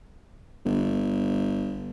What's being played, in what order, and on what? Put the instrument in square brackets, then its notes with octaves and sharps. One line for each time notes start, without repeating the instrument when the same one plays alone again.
[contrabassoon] G1